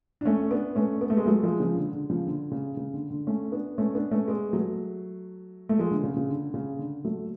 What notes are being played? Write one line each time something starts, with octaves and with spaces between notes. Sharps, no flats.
D4
A3 C#4
B3 D4
A3 C#4
B3
A3
G#3 B3
F#3 A3
F3 G#3
C#3 F3
D3
D3
C#3 F3
D3
C#3
C#3
D3
D3
A3 C#4
B3 D4
A3 C#4
B3 D4
A3 C#4
G#3 B3
F#3 A3
A3
F3 G#3
D3
C#3
C#3
D3
C#3
D3
F#3 A3